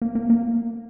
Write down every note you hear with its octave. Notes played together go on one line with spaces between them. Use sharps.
A#3
A#3
A#3